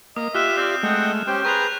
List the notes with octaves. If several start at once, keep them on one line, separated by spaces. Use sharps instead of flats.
A#3 D#5 D#6
F4 G4 E5 F6 F#6 E7
C4 D5
G#3 A3 D#5 F#5 G5
C#4 G4 C5 G5
G#4 B4 A#5 C#6 F#6 F7